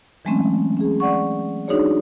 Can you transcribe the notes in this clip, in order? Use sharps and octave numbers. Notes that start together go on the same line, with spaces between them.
E3 F#3 G#3 A3 C4 C#4
C#4 G#4
D5 F#5 C#6
D4 D#4 F#4 G#4 C#5 D5